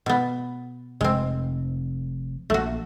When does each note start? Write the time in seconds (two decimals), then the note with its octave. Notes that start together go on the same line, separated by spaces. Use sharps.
0.06 B2 B3
1.01 F1 F2 G#3 C4
2.50 A#1 A3 F#4